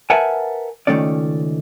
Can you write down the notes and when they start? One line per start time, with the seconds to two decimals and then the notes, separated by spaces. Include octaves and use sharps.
0.10 A#4 B4 E5 F#5 G#5 A5
0.87 C#2 B2 D#3 A3 C#4 D5